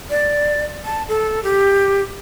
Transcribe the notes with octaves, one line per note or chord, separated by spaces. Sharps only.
D5
A5
A4
G4